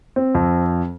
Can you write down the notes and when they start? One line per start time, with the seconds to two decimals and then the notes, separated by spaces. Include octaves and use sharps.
0.16 C4
0.35 F2